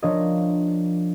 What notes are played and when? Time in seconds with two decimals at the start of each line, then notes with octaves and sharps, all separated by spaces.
0.03 F3 D4 A#4 C#5 D#5